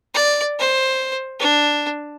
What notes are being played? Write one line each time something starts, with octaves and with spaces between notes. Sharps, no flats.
D5
C5
D4